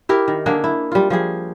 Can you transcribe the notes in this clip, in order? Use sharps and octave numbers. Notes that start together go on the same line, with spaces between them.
E4 G4 A#4
D#3
D3 A#3 D4 G#4
E4
G3 F4
F3 G3 G#4